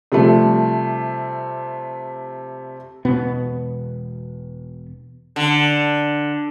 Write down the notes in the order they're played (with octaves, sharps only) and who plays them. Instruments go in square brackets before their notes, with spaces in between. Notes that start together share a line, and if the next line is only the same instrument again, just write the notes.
[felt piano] C3 F3 G3 A3
[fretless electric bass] E1 B2 B3
[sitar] D3